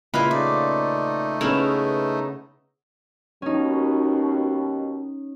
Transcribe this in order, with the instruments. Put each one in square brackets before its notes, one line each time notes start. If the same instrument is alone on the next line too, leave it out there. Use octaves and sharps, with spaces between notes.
[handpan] C#3 A#3 F4 [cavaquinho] E4 B5 [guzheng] B4 D#5 F5
[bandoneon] A3 D#4 [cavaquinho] D5
[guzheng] C#3 E4 [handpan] B3 G#4 [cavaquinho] A#4
[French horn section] D#2 B2 [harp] C#4 D#4